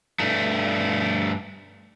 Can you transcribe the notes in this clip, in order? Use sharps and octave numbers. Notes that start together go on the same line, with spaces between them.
G2 A3